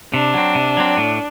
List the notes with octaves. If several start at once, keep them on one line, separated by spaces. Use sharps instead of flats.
C3 D4
F#3 C4
C3
F#3 C4
A2